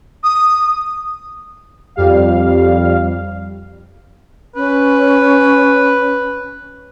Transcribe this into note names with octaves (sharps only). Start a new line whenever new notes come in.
D#6
F2 G3 F5
C#4 B4